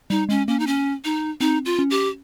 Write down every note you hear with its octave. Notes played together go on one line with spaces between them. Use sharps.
G3 D#4
G#3 C#4
A#3 C#4
D#4
C#4
D#4
C4 D#4
F4
C#4
G4